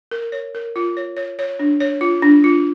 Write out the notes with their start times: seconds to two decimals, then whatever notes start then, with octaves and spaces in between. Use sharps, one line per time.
0.11 A#4
0.32 C#5
0.55 A#4
0.76 F4
0.97 C#5
1.17 C#5
1.39 C#5
1.59 D4
1.81 C#5
2.01 F4
2.22 D4
2.44 F4